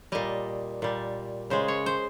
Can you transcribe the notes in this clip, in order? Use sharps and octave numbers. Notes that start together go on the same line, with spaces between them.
A#2 G3 D#5
A#2 G3
C#3 G#3 C5
C#5
C5